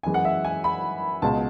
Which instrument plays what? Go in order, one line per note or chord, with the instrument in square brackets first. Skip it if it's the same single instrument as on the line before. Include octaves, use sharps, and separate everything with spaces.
[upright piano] F#2 E3 G#3 G#5
F#5
E5
G#5
B5
C#2 B2 G#3 A5